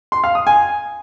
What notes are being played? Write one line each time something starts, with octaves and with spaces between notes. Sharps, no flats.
C6
F5
D#6
G#5